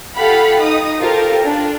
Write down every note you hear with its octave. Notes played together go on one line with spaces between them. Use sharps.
F4 G4 A4 F5 F#5 B5
D#4 D#6
F4 G4 A4 A#4 C5
D4 F4